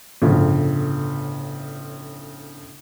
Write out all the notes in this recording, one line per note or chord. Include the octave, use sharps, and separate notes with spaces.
G1 A2 C#3 F3